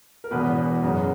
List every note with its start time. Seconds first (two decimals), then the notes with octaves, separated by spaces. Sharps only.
0.24 A#4
0.31 E1 E2 B2 B4
0.83 F#2 C#3 F#3